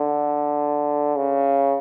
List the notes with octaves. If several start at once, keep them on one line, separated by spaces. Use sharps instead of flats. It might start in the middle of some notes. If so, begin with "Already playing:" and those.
Already playing: D3
C#3